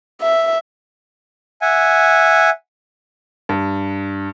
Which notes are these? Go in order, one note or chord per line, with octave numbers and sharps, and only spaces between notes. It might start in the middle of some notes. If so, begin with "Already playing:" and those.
E5
E5 F#5 G#5
G2